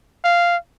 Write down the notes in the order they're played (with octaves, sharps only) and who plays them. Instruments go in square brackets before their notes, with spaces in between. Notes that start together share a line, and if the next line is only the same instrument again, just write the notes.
[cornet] F5